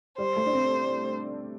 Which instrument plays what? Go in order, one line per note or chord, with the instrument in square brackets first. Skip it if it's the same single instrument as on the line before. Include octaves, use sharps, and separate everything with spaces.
[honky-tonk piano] G3 [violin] C5
[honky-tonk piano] A3
D4
C4